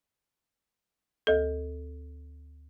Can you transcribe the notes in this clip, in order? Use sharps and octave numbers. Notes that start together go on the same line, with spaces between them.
D2 A4